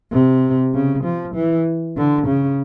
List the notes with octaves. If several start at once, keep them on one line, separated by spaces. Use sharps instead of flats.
C3
C#3
F3
E3
D3
C#3